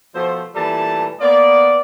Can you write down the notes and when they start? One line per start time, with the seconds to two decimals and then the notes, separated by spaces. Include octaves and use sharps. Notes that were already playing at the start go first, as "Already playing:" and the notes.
0.15 B2 F3 A3 C5
0.55 A#2 E3 G3 A3 A5
1.20 A#3 B3 F4 D5